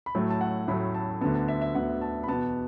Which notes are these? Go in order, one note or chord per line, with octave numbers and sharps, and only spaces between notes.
B5
A2 F#3 A3 A5
A5
F#5
A2 F#3 A3 B5
A5
D2 D3 B3 A5
A5
E5
E5
D2 D3 B3 F#5
A5
B5
E2 B2 B3 A5